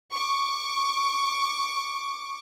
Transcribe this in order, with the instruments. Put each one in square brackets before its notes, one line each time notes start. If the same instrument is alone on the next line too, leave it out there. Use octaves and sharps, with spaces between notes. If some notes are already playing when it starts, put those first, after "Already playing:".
[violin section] C#6 D6